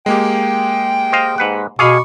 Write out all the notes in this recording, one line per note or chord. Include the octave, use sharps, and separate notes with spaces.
G#3 A#3 G4 G5
C5 D#5 F5
G#2 B4 F#5
B2 G#4 F5 G#5 B5 C#6 D6